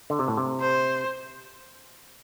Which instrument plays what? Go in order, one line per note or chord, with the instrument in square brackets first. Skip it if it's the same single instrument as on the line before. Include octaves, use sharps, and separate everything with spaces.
[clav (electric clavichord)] D3
C3
A2
C3
[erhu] C5